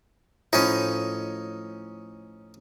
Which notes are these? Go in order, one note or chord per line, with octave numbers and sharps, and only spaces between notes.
A2 F3 C#4 D#4